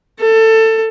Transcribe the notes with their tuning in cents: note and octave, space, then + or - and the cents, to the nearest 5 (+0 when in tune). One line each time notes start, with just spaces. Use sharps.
A4 +20